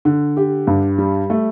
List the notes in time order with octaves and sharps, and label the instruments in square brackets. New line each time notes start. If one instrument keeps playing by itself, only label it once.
[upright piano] D3
G4
G2
G3
A3